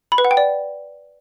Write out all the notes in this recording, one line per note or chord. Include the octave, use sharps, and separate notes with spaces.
B5
B4
F#5
G5
D5